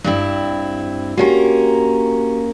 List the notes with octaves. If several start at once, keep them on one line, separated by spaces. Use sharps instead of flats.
G2 C4 E4
A#3 C#4 F#4 G4 A#4